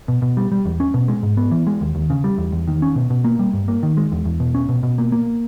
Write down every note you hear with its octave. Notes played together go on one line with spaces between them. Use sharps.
B2
B2
G3
G3
E2
C#4
B2
G#3
G#2
B3
E3
G#3
D#2
D#2
C#3
G3
E2
E2
D#3
C#4
B2
B2
A#3
G3
G2
A#3
D#3
G#3
E2
E2
B2
C#4
B2
B2
A#3
A#3